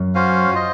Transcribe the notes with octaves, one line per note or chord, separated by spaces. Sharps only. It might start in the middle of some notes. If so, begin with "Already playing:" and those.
Already playing: F#2
C#4 F#4 C5 F5
F4 C5 D#5